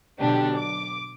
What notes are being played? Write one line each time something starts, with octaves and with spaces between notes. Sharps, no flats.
B2 D3 F#3 D4 G4
D6